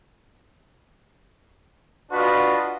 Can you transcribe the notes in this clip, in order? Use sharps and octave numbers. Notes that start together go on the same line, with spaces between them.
D4 F4 F#4 B4 D#5